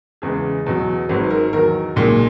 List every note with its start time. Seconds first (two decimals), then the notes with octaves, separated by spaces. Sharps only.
0.22 E2 C#3 E3 G#3 G#4
0.66 E2 B2 F#3
1.09 G#1 G#2 F#3 B4
1.30 A#4
1.53 E2 D#3 F#3 A#4
1.96 B1 A#2 G#3